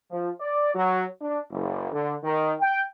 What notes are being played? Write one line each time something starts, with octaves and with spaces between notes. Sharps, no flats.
F3
D5
F#3
D4
F#1
D3
D#3
G5